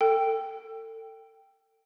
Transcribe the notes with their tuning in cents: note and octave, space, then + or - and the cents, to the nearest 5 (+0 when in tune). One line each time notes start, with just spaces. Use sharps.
A4 +30 G5 +0